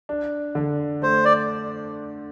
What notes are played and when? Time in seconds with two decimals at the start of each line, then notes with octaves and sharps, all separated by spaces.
0.09 D4
0.55 D3
1.02 A3 C5
1.25 D5